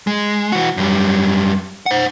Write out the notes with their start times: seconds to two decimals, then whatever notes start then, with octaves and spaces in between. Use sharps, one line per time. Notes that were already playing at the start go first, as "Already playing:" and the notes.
0.07 G#3
0.52 E3 F#4
0.77 F#2 G3
1.86 C5 F#5